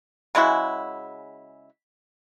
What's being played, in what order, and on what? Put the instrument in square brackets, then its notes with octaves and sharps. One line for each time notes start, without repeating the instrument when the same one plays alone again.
[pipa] C#3 G#3 E4 F#4